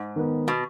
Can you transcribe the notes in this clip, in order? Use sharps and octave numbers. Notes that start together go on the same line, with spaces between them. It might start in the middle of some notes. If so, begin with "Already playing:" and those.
Already playing: G#2
D#3 B3
B2